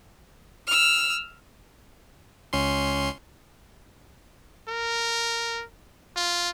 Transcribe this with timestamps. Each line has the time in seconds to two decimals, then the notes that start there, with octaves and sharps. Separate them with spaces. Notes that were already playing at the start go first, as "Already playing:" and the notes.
0.67 E6 F6
2.53 C#2 C#4 C6
4.69 A#4
6.17 F4